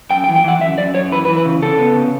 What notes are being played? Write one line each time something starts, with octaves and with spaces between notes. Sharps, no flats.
F#2 G5
G5
E3
G5
E3 F#5
F#2 E5
F#2 D5
F#2 C#5
E3 B4
B4
E3
B4
C#3
C#3 A4
B3
C#3